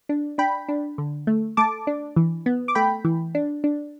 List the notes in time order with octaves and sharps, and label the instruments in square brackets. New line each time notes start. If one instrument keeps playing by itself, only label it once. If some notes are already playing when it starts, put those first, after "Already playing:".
[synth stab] D4
D4 G5 B5
D4
D3
A3
A3 A5 D6
D4
E3
B3
D6
A3 G5 B5
E3
D4
D4